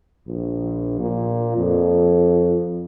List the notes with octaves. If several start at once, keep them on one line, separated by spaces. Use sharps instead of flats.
A#1
A#2
F2